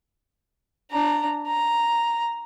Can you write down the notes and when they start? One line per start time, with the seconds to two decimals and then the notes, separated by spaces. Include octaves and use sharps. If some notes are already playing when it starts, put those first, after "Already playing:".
0.92 D4 A#5
1.47 A#5